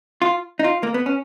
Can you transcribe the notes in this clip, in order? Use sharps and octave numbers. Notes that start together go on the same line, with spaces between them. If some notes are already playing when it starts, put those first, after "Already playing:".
F4
D#4
F4
A#3
B3
C#4